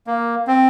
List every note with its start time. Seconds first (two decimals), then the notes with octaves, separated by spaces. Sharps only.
0.07 A#3
0.47 C4